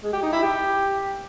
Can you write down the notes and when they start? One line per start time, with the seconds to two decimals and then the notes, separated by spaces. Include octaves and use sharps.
0.03 G#3
0.13 G4
0.23 D#4
0.32 E4
0.42 G4